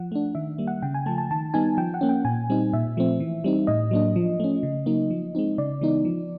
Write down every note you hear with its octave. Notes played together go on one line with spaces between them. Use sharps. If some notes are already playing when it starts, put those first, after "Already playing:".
Already playing: F3 F#5
A3 D4
D#3 E5
G3 A#3
F#5
C#3 G5
G#5
F3 A3 A5
A5
D#3 A5
G3 B3 D#4 G#5
F3 G5
F#5
A#3 C#4
G5
A#2 G#5
G3 C4 D#4
A#2 E5
F3 A3 C4
E3
G3 C4 D#4
A2 D#5
F#3 A#3 D4
F3
A3 C#4
C#3
F#3 A#3 D#4
F3
G#3 C4 D#4
C#3 D5
E3 G#3 B3 D#4
F3